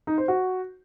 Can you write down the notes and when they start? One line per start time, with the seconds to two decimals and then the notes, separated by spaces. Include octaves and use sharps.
0.07 D#4
0.18 C5
0.28 F#4